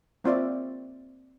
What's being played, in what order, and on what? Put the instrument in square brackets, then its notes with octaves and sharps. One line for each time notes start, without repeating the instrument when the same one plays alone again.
[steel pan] A#3 C4 F4 D5 E5